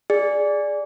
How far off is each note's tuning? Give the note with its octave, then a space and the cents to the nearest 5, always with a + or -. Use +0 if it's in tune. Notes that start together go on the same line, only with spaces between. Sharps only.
G#4 +0 D5 +0